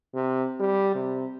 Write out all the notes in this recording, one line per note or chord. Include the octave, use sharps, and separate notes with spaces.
C3
G3
C3